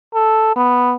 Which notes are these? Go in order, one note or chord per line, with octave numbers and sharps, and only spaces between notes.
A4
B3